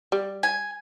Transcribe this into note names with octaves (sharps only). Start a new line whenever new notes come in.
G3
G#5